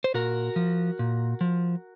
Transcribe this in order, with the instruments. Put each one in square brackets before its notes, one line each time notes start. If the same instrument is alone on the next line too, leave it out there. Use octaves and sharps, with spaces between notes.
[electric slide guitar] C5
A#2 F#4 A#4
F3
A#2
F3